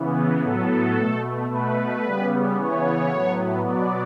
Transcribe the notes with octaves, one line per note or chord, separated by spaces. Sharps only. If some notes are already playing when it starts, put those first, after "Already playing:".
Already playing: C#3 E3 B3
A2 F#3 B3 A4
B2 A3
B2 A3 B4
C#3 G3 B3
C#3 E3 B3 C#5
A2 F#3 B3
B2 F#3 B3 D5